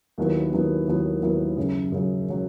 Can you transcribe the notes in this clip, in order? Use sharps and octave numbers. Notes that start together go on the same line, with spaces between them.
D#2 D#3 F#3 B3 E4
D#2 D#3 F#3 B3 E4
D#2 D#3 F#3 B3 E4
D#2 D#3 F#3 B3 E4
F#2 C#3 F#3
F#2 C#3 F#3
C#3 F#3